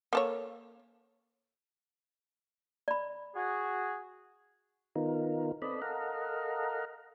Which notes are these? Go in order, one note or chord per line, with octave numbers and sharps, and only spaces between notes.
A#3 A4 C#5
D5 B5
F#4 G#4
D#3 B3 D#4 F4 A#4
C4 A4 B4 D5 D#5 B5
A4 A#4 D#5 F5 F#5 A#5